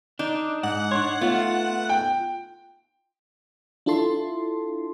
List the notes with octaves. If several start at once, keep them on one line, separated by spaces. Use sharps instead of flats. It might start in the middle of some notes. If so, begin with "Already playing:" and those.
D4 D#4
G#2 F#5
D4 C#5 C6
A3 B3 F4
G5
D4 E4 F4 A4 A5 C6